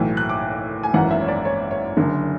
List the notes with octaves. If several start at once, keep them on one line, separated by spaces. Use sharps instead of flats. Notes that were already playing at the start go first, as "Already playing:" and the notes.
Already playing: B1 A2 E3
F#6
D6
G#5
G#1 F#2 E3 F#5
E5
C#5
D5
C#5
C#5
F#1 F#2 D3